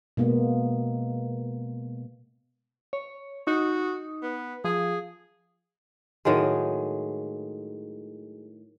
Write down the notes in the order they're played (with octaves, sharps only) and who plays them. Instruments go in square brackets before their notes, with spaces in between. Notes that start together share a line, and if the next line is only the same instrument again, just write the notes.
[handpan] B2 G#3 A#3 B3
[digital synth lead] C#5
[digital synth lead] D#4 [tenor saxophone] F#4
[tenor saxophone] B3
[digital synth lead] F3 [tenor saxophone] G#4
[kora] A2 D#3 F#3 G#3